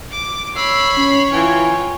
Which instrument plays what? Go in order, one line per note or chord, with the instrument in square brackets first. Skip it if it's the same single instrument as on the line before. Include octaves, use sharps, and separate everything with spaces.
[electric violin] D6
[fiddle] C#5 [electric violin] B5 C7 [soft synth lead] E6
[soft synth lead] C#4
[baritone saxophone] E3 [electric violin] F4 G5 [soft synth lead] G#5